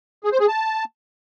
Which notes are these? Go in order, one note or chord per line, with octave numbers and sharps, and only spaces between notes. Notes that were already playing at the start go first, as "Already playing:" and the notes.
G#4
C5
G#4
A5